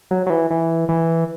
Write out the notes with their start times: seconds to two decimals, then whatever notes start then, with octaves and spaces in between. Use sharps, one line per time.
0.11 F#3
0.26 F#3
0.30 E3
0.50 E3
0.89 E3